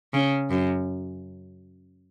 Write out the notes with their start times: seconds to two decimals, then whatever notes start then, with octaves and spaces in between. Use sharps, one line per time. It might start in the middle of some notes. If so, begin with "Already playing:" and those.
0.14 C#3
0.51 F#2